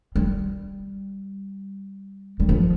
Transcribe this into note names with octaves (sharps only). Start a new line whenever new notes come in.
G3
G3
F3